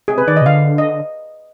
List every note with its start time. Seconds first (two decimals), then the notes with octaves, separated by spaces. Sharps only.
0.08 C3 G#4
0.18 B4
0.27 D#3 D5
0.36 D#5
0.42 C3
0.46 D3 F5
0.78 D#5